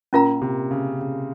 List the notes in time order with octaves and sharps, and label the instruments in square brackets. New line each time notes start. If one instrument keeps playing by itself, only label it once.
[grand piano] A#2 [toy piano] C#4 F4 A#4 F5 A#5
[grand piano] C3
C#3
C#3